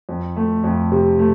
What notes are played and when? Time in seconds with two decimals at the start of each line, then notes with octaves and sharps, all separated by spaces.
0.09 F2
0.36 A3
0.64 F2
0.92 C3
1.19 A3